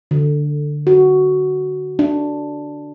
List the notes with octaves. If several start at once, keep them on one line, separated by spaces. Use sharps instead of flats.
D3
F#4
D4